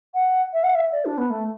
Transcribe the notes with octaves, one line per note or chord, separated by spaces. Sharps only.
F#5
E5
F#5
E5
D5
D4
B3
A3